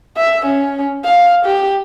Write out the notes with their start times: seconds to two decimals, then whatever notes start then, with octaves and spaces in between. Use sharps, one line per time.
0.17 E5
0.46 C#4
1.05 F5
1.46 G4